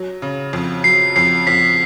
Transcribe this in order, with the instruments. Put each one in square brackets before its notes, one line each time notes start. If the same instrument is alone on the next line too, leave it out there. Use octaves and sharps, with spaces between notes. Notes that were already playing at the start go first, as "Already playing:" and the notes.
Already playing: [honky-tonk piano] F#3
C#3
F2
[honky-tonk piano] F#3 [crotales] C7
[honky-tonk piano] F2 [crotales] C7
[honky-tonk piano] F2 [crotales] B6